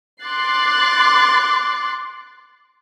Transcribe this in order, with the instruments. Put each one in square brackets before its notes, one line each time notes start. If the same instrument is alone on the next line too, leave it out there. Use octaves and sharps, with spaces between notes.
[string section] C6 D6 F#6 A6 C7